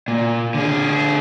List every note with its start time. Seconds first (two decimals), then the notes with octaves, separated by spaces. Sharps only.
0.08 A#2
0.54 D3 G#4